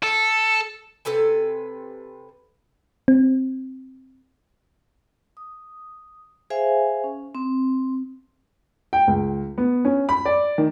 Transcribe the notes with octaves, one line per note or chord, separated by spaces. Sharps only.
A4
C3 A4 B4 G#5
C4
D#6
G#4 C5 E5 F5 G#5
C#4
C4
G5
C#2
B3
C#4
B5
D5
D#3